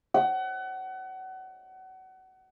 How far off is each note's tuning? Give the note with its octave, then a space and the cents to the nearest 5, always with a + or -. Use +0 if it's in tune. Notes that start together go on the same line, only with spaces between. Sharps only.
F#5 +30